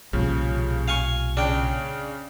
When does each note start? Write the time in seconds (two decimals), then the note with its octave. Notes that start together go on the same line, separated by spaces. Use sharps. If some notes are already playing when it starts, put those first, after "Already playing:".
0.13 B1 A#2 C#3 F3 G3
0.88 F5 G#5 C#6
1.37 C#3 D4 G5